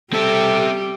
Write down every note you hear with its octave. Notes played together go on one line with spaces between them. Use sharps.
G3 C4 G4 A4 E5